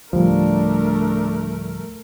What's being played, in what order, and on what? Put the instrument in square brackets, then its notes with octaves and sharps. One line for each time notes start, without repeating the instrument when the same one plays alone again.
[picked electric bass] D2 A2 [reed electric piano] F3 G3 [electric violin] A3 A#4 [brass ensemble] D4